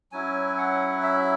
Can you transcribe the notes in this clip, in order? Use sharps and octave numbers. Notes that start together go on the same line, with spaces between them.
F#3 C#4 E4 G#5
F#5
E5